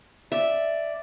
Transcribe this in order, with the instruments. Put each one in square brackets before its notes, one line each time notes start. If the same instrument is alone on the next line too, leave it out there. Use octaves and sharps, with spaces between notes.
[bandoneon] D5 [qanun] E5